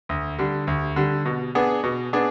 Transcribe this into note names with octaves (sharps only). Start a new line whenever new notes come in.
D2
D3 G3
D2
D3 G3
B2
B3 D4 G#4
B2
B3 D4 G#4